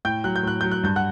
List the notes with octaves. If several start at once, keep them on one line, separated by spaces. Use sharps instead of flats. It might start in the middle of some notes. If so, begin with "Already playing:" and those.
A2 G5 G6
F#3 F#6
G6
A2 F#6
F#3 G6
F#6
G2 G6
F#5 F#6